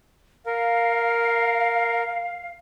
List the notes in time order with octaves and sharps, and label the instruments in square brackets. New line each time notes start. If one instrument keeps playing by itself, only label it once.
[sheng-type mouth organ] A#4 [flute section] F5